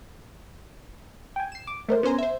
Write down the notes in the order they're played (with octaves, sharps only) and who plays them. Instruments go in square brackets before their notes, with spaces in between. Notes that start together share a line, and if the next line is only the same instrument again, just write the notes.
[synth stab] G5 G#5
C7 E7
D6
A3 A#4 C5
B3 C#4 C5 G#5 A#5
C5 E5